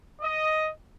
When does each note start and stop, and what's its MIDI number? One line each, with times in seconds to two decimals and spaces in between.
0.21 0.67 75